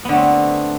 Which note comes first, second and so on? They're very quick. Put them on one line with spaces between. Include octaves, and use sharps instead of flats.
B3 D3 A3 C4